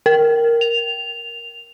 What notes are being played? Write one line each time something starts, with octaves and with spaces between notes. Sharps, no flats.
A#4
F7